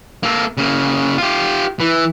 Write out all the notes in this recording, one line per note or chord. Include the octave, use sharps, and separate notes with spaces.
A#3 A4
C#3 A#3
F4 G4
E3